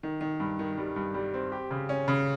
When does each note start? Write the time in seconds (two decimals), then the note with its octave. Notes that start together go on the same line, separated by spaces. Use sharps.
0.03 D#3
0.21 D#3
0.40 G2
0.59 D#3
0.78 G3
0.96 G2
1.14 G3
1.34 C4
1.52 G4
1.71 C#3
1.89 C#4
2.08 C#3